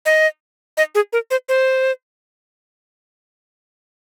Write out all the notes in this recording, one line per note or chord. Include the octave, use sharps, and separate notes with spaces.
D#5
D#5
G#4
A#4
C5
C5